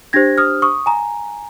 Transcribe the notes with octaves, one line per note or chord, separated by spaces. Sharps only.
D4 G4 C5 G#6 A#6
D#6 F6
C#6 D#6
G#5 A#5